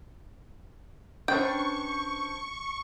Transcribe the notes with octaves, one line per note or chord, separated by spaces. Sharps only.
C#4 D4 B4 C5 D5 G5 C#6